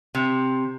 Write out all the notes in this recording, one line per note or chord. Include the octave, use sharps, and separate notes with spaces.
C3